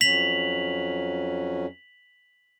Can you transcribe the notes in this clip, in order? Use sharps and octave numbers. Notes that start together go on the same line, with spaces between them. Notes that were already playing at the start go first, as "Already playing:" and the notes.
F2 F#3 C#4 B6 F7 F#7